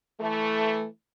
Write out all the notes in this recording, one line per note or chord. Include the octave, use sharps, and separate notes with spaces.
E3 A3